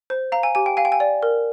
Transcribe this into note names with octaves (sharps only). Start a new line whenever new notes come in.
C5
F5 A#5
G#5
G4 G#5
G5
F5 G#5
G5
G#5
D5
A#4